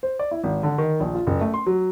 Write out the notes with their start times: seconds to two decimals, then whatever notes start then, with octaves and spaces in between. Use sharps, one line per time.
0.03 C5
0.19 D5
0.31 E4
0.43 G#1
0.63 D3
0.78 D#3
1.00 A#1
1.15 F4
1.27 F#1
1.41 A3
1.54 C6
1.66 F#3